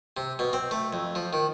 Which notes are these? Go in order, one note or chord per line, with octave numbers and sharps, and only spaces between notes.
C3
B2
C4
A3
F2
F3
D#3